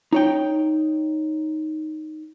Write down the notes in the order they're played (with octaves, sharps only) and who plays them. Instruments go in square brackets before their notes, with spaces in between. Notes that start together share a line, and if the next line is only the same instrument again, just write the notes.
[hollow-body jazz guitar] D#4 C#5 G5